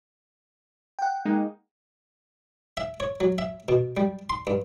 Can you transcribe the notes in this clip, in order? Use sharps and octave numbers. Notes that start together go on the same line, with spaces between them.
F#5 G5
G#3 A#3 D#4
E5
C#5
F#3
E5
B2
G3
C6
G2